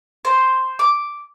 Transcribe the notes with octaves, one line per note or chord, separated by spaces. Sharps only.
C5
D6